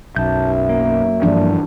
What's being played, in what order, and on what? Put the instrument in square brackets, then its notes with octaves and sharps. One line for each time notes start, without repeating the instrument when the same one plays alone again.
[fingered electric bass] B1 [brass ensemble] F#2 E5 [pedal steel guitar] A5 G6
[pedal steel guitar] A#3
[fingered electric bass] G2 F3 [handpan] E3 D4